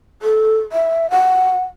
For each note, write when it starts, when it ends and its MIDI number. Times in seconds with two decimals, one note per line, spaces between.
0.22 0.59 69
0.72 1.10 76
1.10 1.62 78